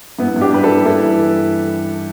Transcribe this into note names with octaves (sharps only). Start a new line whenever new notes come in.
G2 B3 E4
G2
D4 G4
G2 B4
E4 A4
G3
G2 E4 A4
E3